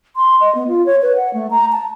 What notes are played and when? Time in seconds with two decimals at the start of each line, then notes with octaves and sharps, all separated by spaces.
0.16 C6
0.41 D#5
0.55 B3
0.68 F4
0.86 C#5
1.02 B4
1.16 F#5
1.34 A3
1.51 A#5
1.72 A5